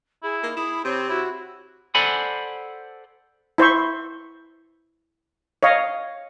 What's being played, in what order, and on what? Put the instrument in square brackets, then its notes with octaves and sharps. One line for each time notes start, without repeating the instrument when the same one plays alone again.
[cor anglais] E4 [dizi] G#4
[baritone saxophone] A#3 [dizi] D#4
[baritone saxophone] E4 [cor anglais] G#4 [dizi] B5
[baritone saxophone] C3 [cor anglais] C4 [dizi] C#5
[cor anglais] E4 [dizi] F#4
[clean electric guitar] A4 C5 D5 F#5 G#5 B5
[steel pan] E4 C5 E5 C#6
C#5 D#5 F5